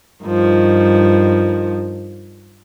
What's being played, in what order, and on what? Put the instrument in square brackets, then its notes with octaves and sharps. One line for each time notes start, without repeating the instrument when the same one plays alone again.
[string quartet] G2 D#3 F3